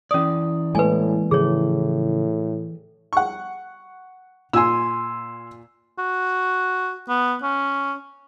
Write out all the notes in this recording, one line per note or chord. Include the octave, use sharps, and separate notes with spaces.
E3 C#4 D5 D#6
A2 G#3 A#3 B4 G#5
A2 C#3 F3 G#4 C#5
F#5 C#6
A#2 G#5 C6 E6
F#4
B3
C#4